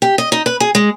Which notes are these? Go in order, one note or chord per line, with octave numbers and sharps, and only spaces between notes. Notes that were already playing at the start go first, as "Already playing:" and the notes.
G4
D#5
D#4
B4
G#4
G#3